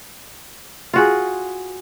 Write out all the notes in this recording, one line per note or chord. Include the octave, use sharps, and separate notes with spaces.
F4 F#4 G#4